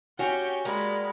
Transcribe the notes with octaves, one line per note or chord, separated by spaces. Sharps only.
C#4 F#4 G4 G5
G3 G#3 A#3 B5